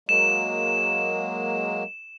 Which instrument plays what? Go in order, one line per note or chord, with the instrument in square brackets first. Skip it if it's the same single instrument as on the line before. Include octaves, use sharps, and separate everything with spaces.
[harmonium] F#3 G#3 A#3 [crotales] E7